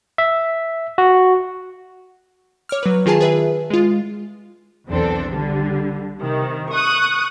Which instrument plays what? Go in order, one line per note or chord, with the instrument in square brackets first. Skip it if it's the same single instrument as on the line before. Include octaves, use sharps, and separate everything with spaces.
[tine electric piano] E5
F#4
[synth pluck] C#5 D6 F6
F#3 B4
D#3 F4 G#4 G#5 A5
G#4 B4 E5
G#3 F4
[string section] B1 E2 C4 D4 A4
D3 G3
C3 D#3
C#6 D#6 F#6